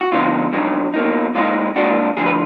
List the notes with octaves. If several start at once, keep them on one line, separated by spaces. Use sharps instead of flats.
F#4
D2 D3 F3 B3 D#4 F4
B2 F#3 D4 D#4
B2 A#3 D#4
A#2 G#3 B3 D#4 F4
A#2 G#3 D4 F#4
D2 D3 F3 G#4
B4